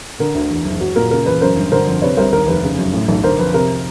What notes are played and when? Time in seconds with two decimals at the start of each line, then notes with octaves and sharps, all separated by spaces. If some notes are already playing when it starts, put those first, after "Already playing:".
0.19 D3 A#4
0.35 D2
0.50 E2
0.65 F#1
0.81 F#3
0.96 A#2 A#4
1.11 C#3 A#4
1.26 E2 B4
1.41 F#2 A#4 C5
1.56 G1
1.72 D3 A#4 C5
1.87 F2
2.02 C3 B4 C#5
2.17 C2 A#4 C5
2.32 D#2 A#4
2.47 F1 B4
2.63 C#3
2.78 F#2
2.93 A2
3.08 B1
3.24 D3 A#4 C5
3.39 F2 B4
3.54 C3 A#4